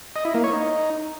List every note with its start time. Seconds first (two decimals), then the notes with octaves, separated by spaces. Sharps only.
0.16 D#5
0.25 E4
0.34 A#3
0.44 C#5
0.53 D#4